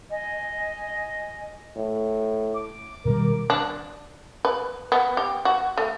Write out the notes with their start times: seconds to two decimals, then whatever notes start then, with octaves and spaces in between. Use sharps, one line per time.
0.10 D#5 G#5
1.76 A2
2.55 D6
3.05 B2 D#3 G3 A#4
3.50 D4
4.45 B4
4.92 B3
5.17 G4
5.45 F#4
5.78 A3